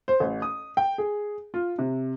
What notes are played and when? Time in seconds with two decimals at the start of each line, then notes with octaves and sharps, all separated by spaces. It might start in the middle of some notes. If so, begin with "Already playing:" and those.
0.08 C5
0.20 A1
0.42 D#6
0.77 G5
0.98 G#4
1.54 F4
1.79 C3